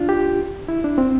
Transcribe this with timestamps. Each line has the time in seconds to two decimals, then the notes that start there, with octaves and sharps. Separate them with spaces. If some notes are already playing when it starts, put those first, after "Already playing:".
Already playing: D4 F4
0.09 G4
0.68 E4
0.84 D4
0.98 C4